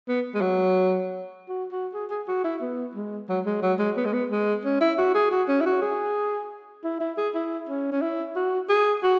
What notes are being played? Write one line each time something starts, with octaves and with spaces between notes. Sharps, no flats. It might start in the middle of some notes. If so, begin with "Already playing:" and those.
B3
G#3
F#3
F#4
F#4
G#4
G#4
F#4
E4
B3
G#3
F#3
G#3
F#3
G#3
B3
G#3
B3
G#3
C#4
E4
F#4
G#4
F#4
C#4
E4
F#4
G#4
E4
E4
G#4
E4
C#4
C#4
E4
F#4
G#4
F#4